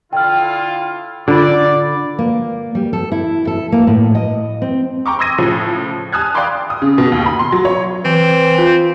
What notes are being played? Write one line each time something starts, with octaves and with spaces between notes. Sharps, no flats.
D3 E4 F4 G5 F6
D3 F4 D5 B5
A#3
G3
A4
E4
A4
A#3
A2
D#5
C4
G5 A#5 C#6 D6
C6 D#6 E6 G#6 A#6 D#7
A2 C#3 F3
G#5 A5 D#6 F6 F#6 G#6
D5 F5 G5 B5 C6 D6
D#6
C#3
B2
D#2
B5
C6
F#3
C#5
E3 C4
F4